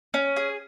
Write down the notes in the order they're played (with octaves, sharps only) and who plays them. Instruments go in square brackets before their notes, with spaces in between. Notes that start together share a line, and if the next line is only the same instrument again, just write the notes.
[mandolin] C#4
G#4